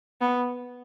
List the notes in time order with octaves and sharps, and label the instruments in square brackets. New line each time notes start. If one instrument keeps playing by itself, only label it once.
[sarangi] B3